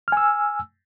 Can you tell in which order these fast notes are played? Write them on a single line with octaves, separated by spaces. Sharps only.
F6 G#5 E6